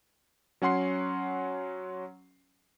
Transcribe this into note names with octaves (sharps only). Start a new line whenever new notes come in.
F#3 C#4 F#5 C6 C7